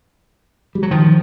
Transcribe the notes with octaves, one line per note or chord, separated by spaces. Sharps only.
G3
F#3
D#3 F3